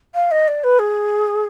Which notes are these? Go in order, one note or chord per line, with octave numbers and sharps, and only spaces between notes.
F5
D#5
D5
B4
G#4